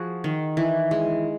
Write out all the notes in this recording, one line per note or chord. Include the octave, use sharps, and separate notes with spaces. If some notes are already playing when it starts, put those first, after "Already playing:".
Already playing: F3 F#4 G#4
D#3
E3
G#3